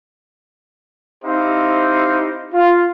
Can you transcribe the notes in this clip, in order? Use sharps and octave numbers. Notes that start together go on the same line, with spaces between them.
C4 D#4 E4 G4 C5 F5
F4